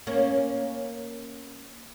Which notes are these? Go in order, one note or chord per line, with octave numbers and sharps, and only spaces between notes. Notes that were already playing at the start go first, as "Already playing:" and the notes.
A#3 C#4